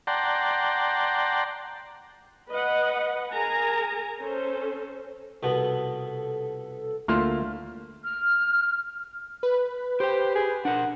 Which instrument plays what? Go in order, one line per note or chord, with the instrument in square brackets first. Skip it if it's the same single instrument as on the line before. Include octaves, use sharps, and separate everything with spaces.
[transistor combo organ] D5 F#5 G5 A5 A#5 C6
[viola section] B4 D#5 F#5
G#4 A#4 G#5 A#5
C#4 A4 C5
[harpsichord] C2 B2 B3 [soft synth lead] A4
[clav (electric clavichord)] D2 A3 A#3 [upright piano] F4 C6 F6
[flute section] F6
[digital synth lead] B4
[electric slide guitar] G4 G5 [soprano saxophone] C5
[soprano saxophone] G#4
[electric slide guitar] D4 A#4 [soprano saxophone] F#5